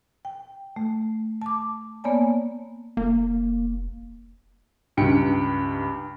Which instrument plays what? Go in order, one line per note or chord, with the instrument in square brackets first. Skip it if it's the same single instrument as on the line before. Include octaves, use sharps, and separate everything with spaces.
[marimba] G5
A3
A5 D6
A#3 B3 C#5 D5 G#5 A5
[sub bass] F1 [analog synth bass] A#3
[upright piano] C#2 G2 G5 C#7